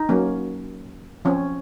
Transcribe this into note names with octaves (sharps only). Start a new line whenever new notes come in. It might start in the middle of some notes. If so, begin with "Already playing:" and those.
Already playing: D#4
F#3 A#3 C#4
F3 C4 C#4